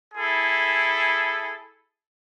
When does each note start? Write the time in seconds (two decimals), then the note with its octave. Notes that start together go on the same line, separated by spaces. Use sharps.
0.14 E4 G#4 A4